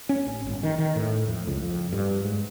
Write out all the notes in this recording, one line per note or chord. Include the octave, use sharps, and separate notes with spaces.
C#4
A1
G1
D#3
D#3
A2
F2
C#2
F2
G2
G#2